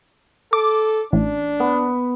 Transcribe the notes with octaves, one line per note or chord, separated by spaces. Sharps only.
A4 D6
A1 D4
B3